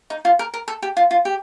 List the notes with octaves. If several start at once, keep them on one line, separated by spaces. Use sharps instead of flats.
D#4
F4
A#4
A#4
A4
G4
F4
F4
G4